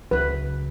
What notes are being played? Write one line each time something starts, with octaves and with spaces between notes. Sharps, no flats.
C#2 C#3 F#3 B4